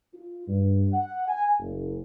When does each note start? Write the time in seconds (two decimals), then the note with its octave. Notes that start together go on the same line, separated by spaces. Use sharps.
0.15 F4
0.48 G2
0.94 F#5
1.28 G#5
1.59 F#1